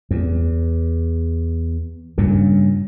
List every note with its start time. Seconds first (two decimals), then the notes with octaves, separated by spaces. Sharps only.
0.11 E2
2.18 G2 A#2 C#3